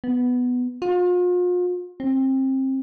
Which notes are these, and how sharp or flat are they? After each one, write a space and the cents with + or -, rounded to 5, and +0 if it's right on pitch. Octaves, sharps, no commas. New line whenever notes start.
B3 +5
F4 +40
C4 +25